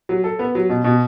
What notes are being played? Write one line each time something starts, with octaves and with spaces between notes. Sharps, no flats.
F#3
A4
B3
F#3
B2
B2